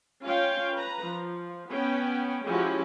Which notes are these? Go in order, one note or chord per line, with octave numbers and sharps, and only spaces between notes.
C#4 F4 C#5 F5 G5
B4 A#5
F3
B3 C#4 G5
F3 G#3 C#4 E4 F#4 G4